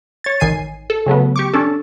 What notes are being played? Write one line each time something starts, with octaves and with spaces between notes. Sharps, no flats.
C#5 A6
A1 D#3 G#5 C7 D#7
A4
C#3 F#3 A3 B3
G4 C#6 D6
C#4 D4 A4